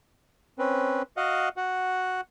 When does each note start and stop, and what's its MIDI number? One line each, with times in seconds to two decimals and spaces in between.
0.59 1.02 60
0.59 1.02 61
0.59 1.02 71
1.17 1.49 66
1.17 1.49 75
1.17 1.49 77
1.17 1.49 78
1.57 2.21 66
1.57 2.21 78